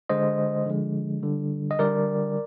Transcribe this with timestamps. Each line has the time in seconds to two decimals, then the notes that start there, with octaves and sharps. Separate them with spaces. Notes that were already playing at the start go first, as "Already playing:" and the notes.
0.09 D3 G#3 C5 D#5
0.66 D3 F3 G#3
1.23 D3 G3
1.71 D#5
1.79 D3 G3 A#4 D5